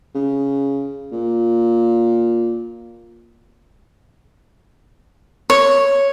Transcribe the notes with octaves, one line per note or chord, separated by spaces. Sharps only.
C#3
A#2
C#5